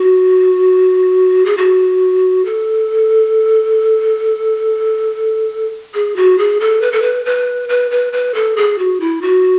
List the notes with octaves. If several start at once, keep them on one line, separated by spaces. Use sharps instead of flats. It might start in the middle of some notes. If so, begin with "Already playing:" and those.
Already playing: F#4
G#4
F#4
A4
G#4
F#4
G#4
A4
B4
A4
B4
B4
B4
B4
B4
A4
G#4
F#4
E4
F#4